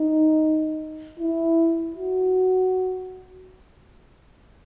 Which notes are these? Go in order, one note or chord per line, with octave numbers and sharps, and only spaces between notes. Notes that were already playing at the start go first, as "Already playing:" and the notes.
Already playing: D#4
E4
F#4